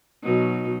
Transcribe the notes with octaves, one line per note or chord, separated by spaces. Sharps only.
B2 F#3 D#4